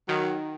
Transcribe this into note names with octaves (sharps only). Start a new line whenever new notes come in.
D#3 F#3